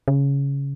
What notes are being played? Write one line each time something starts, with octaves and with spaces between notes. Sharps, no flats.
C#3